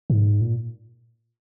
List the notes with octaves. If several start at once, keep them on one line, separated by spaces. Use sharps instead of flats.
G#2
A#2